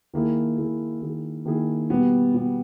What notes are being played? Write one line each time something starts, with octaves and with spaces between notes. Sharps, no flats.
D#3 A#3 E4 G#4
D#3 A#3 E4 G#4
D#3 A#3 E4 G#4
D#3 A#3 E4 G#4
B2 G3 B3
B2 G3 B3